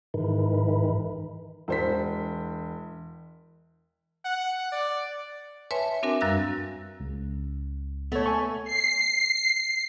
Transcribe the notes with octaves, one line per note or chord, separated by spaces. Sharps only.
G#2 D#3 E3
E1 C5 B6
F#5
D5
B4 C#5 E5 G#5 A5 C6
C4 D4 F#4 A#4 E5 G#5
F#2 G3 F5 E6 F#6 A#6
C#2
A3 B3 C#5
G#5 C#6
C7